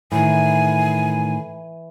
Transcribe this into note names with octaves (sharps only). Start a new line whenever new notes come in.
A2 D#3 E3 G#5